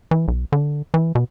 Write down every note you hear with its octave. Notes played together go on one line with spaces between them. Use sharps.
E3
B1
D3
E3
B2